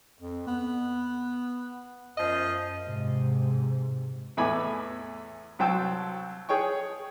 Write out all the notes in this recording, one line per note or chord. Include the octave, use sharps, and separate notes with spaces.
F2
B3
F#2 F3 D#5
G#2 C3
E2 A2 G#5 B5 D6
C2 F#3 C4 G5 A5 E6
G#4 C#5 G5 C#6